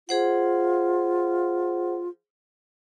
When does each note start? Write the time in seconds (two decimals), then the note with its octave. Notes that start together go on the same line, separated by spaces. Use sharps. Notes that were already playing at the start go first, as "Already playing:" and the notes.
0.09 F4 G#4 C5 F#5